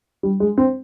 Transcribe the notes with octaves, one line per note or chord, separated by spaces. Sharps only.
G3
G#3
C4